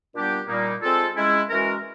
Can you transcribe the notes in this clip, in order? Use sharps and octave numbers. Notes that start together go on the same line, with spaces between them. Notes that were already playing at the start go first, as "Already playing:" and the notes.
A#2 G3 B3 D4 G4
A#2 G3 A#3 D#4
G#3 C4 F4 A4
G#3 C#4 E4
E3 G#3 C#4 F#4 A#4